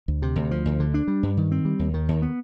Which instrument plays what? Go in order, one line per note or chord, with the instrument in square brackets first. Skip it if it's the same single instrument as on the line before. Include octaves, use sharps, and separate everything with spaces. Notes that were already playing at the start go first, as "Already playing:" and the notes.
[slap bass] D2
C3
D2
F3
D2
D3
D4
G3
G2
D#3
C4
G3
D#2
D#3
D#2
B3